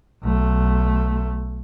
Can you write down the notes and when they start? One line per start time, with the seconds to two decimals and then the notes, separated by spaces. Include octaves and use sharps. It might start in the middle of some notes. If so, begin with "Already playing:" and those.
0.23 B1 A3